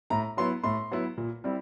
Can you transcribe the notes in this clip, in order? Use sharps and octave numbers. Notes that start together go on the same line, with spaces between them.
A2 A#5
F#3 B3 E4 C6
A2 C6
F#3 B3 E4
A#2
G3 C4 E4